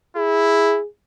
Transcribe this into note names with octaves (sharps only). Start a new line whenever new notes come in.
E4 G#4